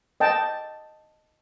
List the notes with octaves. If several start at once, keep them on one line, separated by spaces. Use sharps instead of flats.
D#5 G5 A5